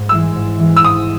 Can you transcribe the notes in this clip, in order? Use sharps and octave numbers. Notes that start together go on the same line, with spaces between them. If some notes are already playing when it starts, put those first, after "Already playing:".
Already playing: G#2
E3 G#3 E6
G#2
E3 G#3
E6
G#2 D#6